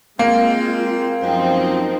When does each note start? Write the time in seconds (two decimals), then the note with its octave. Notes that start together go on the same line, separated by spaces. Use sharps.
0.19 G#3 A#3 C4 F4
1.22 F#2 F3 C4 D#4